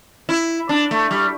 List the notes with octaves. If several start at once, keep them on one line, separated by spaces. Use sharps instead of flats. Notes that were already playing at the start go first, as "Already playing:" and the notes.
E4
D4
A3
G3